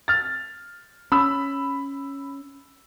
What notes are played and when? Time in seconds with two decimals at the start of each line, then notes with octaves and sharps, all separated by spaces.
0.08 F6 A6
1.12 C#4 B5 E6